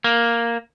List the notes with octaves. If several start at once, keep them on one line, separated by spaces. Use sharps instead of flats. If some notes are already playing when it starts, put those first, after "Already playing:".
A#3